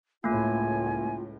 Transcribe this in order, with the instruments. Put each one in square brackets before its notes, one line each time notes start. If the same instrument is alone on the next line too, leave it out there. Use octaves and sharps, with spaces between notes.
[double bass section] C#2 A2 [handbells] A3 A#3 [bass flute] F4 [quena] G#5